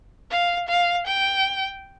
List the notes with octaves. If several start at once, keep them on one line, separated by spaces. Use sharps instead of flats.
F5
F5
G5